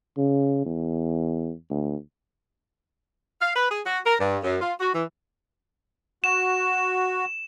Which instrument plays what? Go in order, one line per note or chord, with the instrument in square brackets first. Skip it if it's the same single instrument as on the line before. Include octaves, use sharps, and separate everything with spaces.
[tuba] C#3
E2
D2
[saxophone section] F5
B4
G#4
F#4
A#4
G2
F#2
F4
F#4
E3
[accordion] F#4 [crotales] E7